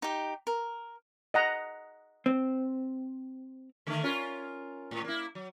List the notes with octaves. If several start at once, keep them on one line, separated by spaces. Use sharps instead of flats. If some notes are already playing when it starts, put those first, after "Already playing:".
D#4 G4
A#4
D#5 F#5 A#5
C4
D3 D#3 A3
C#4 F4 A#4
A2
A#3 E4
F#3